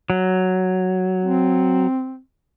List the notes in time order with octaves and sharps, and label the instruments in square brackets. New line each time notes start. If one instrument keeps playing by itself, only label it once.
[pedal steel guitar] F#3
[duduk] C4